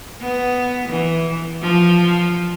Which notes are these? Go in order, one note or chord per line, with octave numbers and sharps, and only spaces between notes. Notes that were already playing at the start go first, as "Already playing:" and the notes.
B3
E3
F3